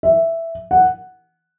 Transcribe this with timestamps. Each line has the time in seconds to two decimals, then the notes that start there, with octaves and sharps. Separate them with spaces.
0.03 E5
0.71 F#5